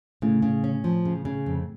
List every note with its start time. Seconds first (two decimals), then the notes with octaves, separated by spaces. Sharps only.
0.22 A2 C#3
0.42 C#3
0.64 C#4
0.84 F3
1.05 C#3
1.25 C#3
1.46 F2